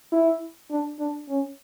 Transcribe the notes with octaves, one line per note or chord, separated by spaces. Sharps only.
E4
D4
D4
C#4